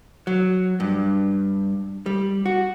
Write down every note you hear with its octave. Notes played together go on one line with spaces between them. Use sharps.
F#3
G2
G3
F#4